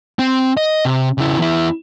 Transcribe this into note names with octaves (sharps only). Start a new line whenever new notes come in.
C4
D#5
C3
C#3 E4
E2 E4